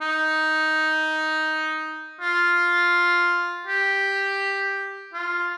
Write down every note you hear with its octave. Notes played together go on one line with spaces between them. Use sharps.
D#4
F4
G4
F4